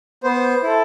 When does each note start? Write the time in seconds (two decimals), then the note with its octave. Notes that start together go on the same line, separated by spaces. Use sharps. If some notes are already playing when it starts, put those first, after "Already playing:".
0.23 B3 C5
0.63 E4 A4